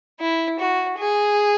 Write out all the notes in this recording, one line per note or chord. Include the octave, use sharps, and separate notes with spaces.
E4
F#4
G#4